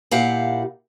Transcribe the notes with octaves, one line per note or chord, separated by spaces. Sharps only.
A#2 E4 G4 F5 F#5